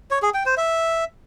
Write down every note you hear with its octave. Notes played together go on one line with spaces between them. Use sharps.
C#5
G#4
G5
C5
E5